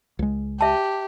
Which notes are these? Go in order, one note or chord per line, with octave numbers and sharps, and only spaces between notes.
C#2 G#3
G4 E5 A5